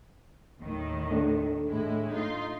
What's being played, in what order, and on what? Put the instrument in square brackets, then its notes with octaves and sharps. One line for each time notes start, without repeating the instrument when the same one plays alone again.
[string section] D#2 A2 D#3
[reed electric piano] A3 D4 A4
[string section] A2 G#3 E4
D#4 F4 C6